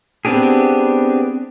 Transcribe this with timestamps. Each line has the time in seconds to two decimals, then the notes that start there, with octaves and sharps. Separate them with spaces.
0.25 B3 C4 D4 G4 G#4